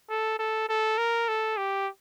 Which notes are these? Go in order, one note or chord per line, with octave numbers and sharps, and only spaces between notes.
A4
A4
A4
A#4
A4
G4